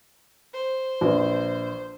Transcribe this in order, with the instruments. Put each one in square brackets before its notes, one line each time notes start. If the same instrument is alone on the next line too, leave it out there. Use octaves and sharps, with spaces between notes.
[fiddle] C5
[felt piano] A#1 B4